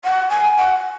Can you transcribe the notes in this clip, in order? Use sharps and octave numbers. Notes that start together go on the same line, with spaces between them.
F#5
G#5
F#5